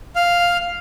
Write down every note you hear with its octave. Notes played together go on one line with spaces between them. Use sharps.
F5